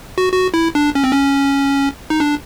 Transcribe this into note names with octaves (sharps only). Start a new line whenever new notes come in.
F#4
F#4
E4
D4
C#4
C4
C#4
D#4
D4